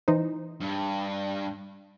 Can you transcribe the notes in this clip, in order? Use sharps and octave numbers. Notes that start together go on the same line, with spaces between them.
E3 D#4 C5
G2